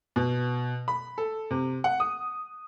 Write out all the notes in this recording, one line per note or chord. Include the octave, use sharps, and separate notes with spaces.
B2
B5
A4
C3
F#5
D#6